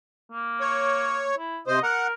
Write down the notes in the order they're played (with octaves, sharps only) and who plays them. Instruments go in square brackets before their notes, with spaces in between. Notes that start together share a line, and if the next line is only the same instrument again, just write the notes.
[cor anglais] A#3
[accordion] C#5
[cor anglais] E4
[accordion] C3 C5 [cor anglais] D#5
[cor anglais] A#4 [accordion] F#5